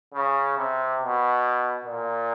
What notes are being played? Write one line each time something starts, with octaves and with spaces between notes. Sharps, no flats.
C#3
C3
B2
A#2